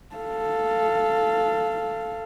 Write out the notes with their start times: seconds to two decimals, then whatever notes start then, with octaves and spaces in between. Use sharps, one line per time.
0.16 A4 F5